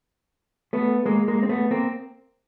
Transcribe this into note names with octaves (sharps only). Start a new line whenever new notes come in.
A3 B3
G#3 A#3
G#3 A#3
C4
A3 B3
A#3 C4